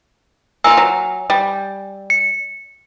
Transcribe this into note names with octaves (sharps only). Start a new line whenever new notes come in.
A#3 F4 G#5 E6
F#3
G3
C#7